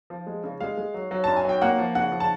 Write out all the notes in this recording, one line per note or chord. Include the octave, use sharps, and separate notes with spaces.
F3
G#3
C#3
G#3 F5
G#3
F#3
F#3
F#2 A5
G#5
F#3 G5
A#3 F#5
F3
C#3 F#5
F3
A5